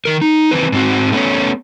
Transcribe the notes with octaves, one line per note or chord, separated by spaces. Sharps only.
D#3 A#4
D#4
D#3 E3 C4 B4
G#2 C4 F#4
A3 B3 C#4 C#5